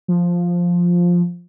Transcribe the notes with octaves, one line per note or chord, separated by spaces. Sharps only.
F3